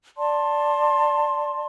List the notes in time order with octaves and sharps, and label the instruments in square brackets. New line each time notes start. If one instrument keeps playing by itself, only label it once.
[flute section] D5 A5 C6